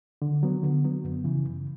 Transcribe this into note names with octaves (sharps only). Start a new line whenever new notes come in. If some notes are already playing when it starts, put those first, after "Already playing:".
D3
F#3 B3
D3
F#3 B3
F#2
C#3 E3
F#2